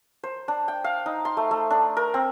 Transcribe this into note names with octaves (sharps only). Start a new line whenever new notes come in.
C5
D4
G5
F5
D#4
C6
A3
A3
D4
A#4
C4